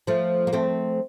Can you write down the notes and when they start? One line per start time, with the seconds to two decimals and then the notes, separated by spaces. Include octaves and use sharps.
0.07 F3 A3
0.47 A#3
0.53 A3 C4